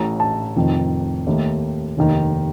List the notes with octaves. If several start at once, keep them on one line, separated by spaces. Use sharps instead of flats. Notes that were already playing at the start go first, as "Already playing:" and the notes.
Already playing: A1 A2 A3 A#5
A5
F1 F2 D#3
D#2 D#3 A3
F1 D#2 D#3